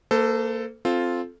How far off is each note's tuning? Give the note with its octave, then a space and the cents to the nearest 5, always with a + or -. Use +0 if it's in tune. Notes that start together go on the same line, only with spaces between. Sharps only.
A#3 -20 A4 +5 C5 -40
C4 +0 F4 +0 A4 -15